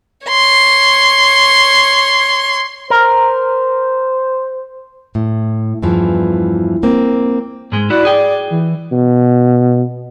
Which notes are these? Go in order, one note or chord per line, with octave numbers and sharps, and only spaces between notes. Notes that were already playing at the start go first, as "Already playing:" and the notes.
C#5 C6
A#4 C5
A2
E2 G2 E3 F3
A#3 C4
G#2 G#3
E4 F#4 D5
G#4 G5
E3
B2